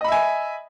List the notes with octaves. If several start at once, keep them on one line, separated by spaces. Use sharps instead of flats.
D#5 E5 G#5 B5